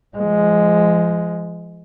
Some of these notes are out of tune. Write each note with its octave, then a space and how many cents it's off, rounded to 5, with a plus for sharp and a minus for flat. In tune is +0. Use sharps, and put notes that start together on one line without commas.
F3 -30 G#3 +0